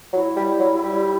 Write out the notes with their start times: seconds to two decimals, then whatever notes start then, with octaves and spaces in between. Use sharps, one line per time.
0.12 F#3 E4 F#4
0.36 G3
0.60 F#3
0.83 G3